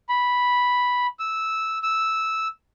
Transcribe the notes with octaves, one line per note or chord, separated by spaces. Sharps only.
B5
E6
E6